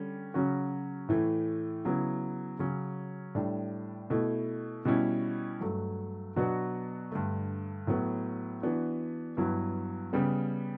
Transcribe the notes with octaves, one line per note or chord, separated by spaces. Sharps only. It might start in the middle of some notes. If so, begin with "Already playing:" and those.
Already playing: D3 G3 C#4
C#3 F#3 C#4 F#4
A2 E3 A3 E4
C#3 F#3 B3 E4
C#3 F#3 C#4
A2 G3 D4
B2 A3 E4
B2 G3 C#4 E4
G2 F#3 A3
B2 F#3 B3 D4 F#4
G2 D3 A3
A2 F#3 B3
E3 B3 D4 F#4
G2 F#3 B3 E4
C#3 G3 B3